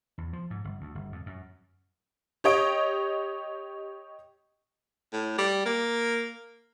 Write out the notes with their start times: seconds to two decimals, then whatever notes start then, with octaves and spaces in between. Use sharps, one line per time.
0.18 E2
0.33 F3
0.50 G#2
0.64 G1
0.81 D2
0.95 G1
1.12 F2
1.26 F#2
2.44 G4 C#5 D#5 D7
5.13 A2
5.38 G3
5.65 A#3